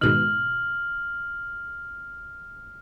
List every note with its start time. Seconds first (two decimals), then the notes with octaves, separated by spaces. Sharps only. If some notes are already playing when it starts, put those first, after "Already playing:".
0.01 G#2 B2 D#3 F6 F#7